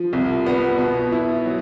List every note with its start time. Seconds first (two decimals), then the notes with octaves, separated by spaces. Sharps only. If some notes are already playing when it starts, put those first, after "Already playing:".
Already playing: F3
0.13 C2
0.46 B3
0.78 B2
1.12 E4
1.45 F#3